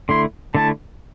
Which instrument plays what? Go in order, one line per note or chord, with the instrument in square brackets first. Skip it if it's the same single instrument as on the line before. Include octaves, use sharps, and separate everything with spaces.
[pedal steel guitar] D3 A3 E4 [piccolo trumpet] C6
[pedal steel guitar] D3 A3 E4 [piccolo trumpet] A5